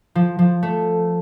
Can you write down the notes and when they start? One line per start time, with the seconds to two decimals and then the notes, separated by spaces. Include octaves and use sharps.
0.15 F3
0.39 F3
0.63 A3